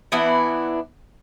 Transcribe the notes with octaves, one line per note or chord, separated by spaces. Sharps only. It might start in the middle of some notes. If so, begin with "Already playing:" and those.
E3 B3 D4 E4